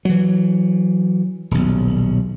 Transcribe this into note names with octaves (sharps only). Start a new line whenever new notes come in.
E3 F#3
D#1 B1